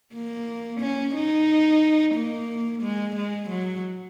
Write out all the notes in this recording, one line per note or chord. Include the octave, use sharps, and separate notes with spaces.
A#3
C#4
D#4
A#3
G#3
G#3
F#3